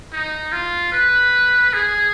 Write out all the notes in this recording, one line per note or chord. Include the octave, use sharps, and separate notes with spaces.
D#4
F4
B4
G#4